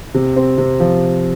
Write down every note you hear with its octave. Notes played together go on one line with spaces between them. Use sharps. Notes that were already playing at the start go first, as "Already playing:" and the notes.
C3
C4
C3
F3